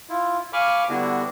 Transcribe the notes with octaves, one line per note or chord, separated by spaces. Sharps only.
E4 F4
F5 G#5 B5 C#6 D6 F6
D3 G3 B3 D4 E4 F#4